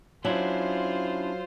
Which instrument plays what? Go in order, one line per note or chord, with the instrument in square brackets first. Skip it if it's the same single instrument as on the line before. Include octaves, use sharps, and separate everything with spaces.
[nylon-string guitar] F#3 [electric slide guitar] C#4 D4 E4 [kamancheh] F4 C5